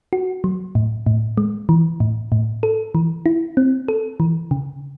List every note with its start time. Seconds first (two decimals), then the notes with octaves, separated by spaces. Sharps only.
0.13 F#4
0.44 F#3
0.75 A2
1.06 A2
1.38 G#3
1.69 E3
2.00 A2
2.32 A2
2.63 A4
2.95 E3
3.26 E4
3.57 C4
3.88 A4
4.20 E3
4.51 C#3